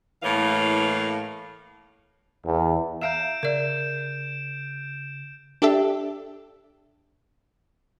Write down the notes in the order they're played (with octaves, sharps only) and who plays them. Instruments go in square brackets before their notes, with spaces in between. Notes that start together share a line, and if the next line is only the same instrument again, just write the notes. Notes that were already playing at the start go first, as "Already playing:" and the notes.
[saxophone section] A2 E3 A#3 C#5 F5
[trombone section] E2
[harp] E5 F5 A#5 [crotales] G6 D7 E7
[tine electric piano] C#3 [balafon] A#4 D5
[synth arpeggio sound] D4 G4 A4 E5